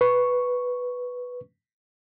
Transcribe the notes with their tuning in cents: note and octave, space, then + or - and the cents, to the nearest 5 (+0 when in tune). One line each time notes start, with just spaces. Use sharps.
B4 +0 C#6 +0